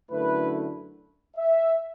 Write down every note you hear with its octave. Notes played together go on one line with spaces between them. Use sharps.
F#2 D3 A3 E4 B4
E5